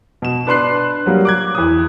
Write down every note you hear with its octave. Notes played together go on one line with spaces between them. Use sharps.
B2 E7
D4 B4 C6 F#6 C7
F#3 G3 A#3
D6 F#6 G#6
E2 D#6